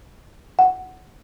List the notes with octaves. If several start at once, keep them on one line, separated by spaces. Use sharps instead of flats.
F#5